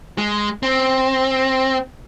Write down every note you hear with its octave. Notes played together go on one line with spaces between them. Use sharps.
G#3
C4